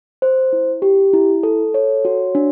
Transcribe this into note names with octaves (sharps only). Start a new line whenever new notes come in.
C5
E4
G4
E4
A4
C#5
F#4
D4